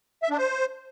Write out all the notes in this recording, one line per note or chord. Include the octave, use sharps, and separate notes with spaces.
E5
D4
C5